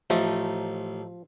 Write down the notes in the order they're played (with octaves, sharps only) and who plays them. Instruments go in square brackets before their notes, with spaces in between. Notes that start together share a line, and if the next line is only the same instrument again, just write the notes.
[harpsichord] A1 [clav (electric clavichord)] F3 [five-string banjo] A3 D#4